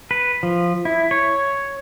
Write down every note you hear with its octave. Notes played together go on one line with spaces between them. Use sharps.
B4
F3
E4
C#5